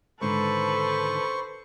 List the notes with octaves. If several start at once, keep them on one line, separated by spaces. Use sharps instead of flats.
G#2 D3 D#3 A4 B4 C5 C#6